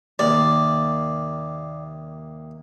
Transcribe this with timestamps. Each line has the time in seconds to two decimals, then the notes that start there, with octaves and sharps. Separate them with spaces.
0.19 D#2 C3 A#3 D5